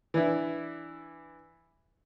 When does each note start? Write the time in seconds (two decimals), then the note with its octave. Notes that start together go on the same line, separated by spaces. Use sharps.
0.14 E3 D4 E4